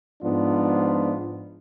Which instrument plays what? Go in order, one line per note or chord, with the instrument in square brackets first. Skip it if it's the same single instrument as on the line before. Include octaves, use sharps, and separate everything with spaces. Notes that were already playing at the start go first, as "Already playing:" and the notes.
[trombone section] G#2 F3 B3 D4 F4